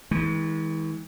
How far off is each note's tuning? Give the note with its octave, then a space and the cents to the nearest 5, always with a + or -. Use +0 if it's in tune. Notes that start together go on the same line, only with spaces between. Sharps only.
E3 -40 G#3 +0